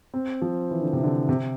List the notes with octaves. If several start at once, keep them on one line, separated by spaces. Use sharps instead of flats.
C4
F3
E3
D3
C3
D3
C3